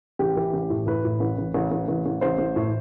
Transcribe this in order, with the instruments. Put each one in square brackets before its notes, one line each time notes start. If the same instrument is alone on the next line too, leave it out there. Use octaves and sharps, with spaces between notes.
[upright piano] A1 G4
E3
A1
A2
A2 B4
A2
A1
A1
A1
A1
A1
A1
A1 C5
A1
A2